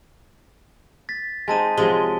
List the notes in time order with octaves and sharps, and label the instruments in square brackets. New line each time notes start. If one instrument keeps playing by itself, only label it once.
[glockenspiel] A6 B6
[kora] G#3 C4 D#4 [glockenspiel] G#5 A5 D#7
[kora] C3 F3 F#3 [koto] G#3 [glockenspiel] G7